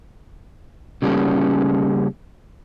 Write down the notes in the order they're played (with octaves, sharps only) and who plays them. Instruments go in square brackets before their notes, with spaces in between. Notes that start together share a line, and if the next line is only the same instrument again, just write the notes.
[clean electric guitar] C#3 G3 A#3 C#4 A4